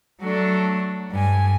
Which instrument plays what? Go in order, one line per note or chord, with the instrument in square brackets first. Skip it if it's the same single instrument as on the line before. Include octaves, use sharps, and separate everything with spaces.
[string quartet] F#3 A3 D4 A4
G2 G#5